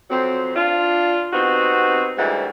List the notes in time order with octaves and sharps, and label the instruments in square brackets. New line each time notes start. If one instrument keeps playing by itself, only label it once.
[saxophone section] F2 F#3 C4
D4 F4
C3 B3 C4 D#4 F#4
D2 G#2 E3 G3 F#5